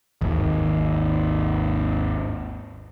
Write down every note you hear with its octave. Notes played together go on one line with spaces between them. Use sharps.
G#1 D#2